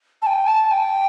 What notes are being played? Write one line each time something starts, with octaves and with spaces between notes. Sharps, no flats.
A5
G5
A5
G5